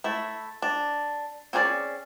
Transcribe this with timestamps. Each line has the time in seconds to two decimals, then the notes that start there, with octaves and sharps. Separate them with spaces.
0.04 A3 E4
0.62 D4
1.53 C4 C#4 G#4 C5 D5